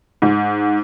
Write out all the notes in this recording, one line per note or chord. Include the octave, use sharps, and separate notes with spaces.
G#2